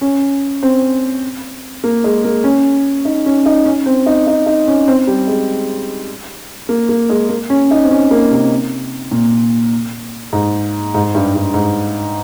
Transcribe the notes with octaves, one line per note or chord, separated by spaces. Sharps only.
C#4
C4
A#3
G#3
A#3
C#4
D#4
C#4
D#4
C#4
C4
D#4
D#4
D#4
C#4
C4
G3
G#3
A#3
A#3
G#3
A#3
C#4
D#4
C4
C#4
A#3
C3
A#2
G#2
G#2
G2
G2
G#2